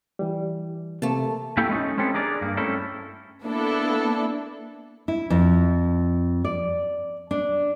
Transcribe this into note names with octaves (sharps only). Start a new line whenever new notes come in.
E3 G3
C3 A3 A#3 A5
A3 A#3 E4 G4 A4 G5
G#3 A3 C#4 D#4
C4 C#4 G4 A4 B4
D4 G#4 A#4 D5
G2 A#3
A3 C4 C#4 E4 A4
A#3 B3 D4 E4 A4
E4
F2
D5
D4